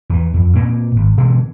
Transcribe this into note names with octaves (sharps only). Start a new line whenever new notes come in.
E2 E3
F2
A#2 A#3 C4
G#1
B2 D3 E3 G#3